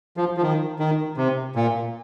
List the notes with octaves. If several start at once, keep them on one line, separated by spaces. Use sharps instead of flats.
F3
F3
D#3
D#3
C3
A#2